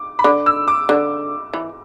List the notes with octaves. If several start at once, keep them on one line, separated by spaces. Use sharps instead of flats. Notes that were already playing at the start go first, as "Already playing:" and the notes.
Already playing: D6
B5
D3 D6
E6
D6
D3
E3